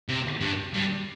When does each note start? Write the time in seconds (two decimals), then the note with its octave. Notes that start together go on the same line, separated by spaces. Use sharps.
0.09 C3
0.41 G2
0.74 G2